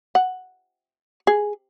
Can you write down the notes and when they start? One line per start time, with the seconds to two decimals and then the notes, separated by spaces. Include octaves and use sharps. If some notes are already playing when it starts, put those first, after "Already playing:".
0.15 F#5
1.27 G#4